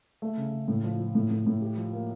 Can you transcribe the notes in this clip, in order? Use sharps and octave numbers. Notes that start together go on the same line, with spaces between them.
A3
C#3
C#3
A2
F3
F3
A2
A2
A2
G4
F3
A#3